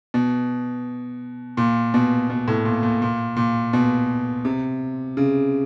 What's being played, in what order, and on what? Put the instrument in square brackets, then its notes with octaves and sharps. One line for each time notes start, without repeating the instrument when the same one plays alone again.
[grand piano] B2
A#2
B2
B2
A2
A#2
A#2
A#2
A#2
B2
C3
C#3